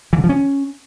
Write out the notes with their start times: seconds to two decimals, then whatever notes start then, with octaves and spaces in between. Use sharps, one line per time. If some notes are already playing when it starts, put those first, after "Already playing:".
0.13 E3
0.18 D3
0.24 F3
0.29 C#4